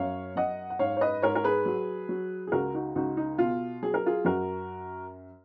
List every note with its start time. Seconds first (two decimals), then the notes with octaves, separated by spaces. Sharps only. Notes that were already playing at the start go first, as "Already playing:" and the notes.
Already playing: F#2 C#5 F5
0.36 F#2 D#5 F#5
0.70 F#5
0.79 G#2 C#5 F5
0.97 C#5
1.01 B4 D#5
1.22 G#2 A#4 C#5
1.35 A#4
1.44 G#4 B4
1.66 F#3
2.09 F#3
2.47 G#4
2.52 C#2 F#4 A#4
2.74 D#4 F#4
2.95 C#2 D#4 F#4
3.17 D#4
3.38 B2 F4
3.82 F#3 G#4
3.94 A#4
4.06 F4 G#4
4.25 F#2 F#4 A#4